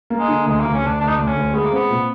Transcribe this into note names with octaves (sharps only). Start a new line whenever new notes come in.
A#3
G#3
D3
D2 G#3
D2 A#3
C#4
D2 D4
D2 D4
D#4
D2 D4
C#4
D2
G#3 B3
A#3
B3 C4
A#2